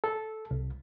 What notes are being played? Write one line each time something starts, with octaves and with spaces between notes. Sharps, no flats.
A4
C2